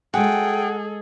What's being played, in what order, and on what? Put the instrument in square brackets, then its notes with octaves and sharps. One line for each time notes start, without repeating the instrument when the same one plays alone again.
[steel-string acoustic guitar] G#3 G#5 [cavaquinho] F#4 [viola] G#4 A4 [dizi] G5